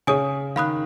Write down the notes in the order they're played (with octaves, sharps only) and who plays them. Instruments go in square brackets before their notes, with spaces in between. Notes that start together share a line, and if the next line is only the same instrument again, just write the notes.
[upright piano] C#3 [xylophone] G#4 C#5 G#5 D#6
[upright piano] D#3 [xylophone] F5 B5 D#6 F#6